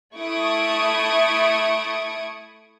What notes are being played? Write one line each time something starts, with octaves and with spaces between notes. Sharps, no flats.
A3 E4 C#6 D#6 G#6 D7